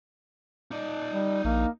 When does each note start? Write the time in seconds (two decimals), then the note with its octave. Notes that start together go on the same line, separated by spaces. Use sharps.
0.71 D#4 D5
1.13 G3
1.44 A#1 A#3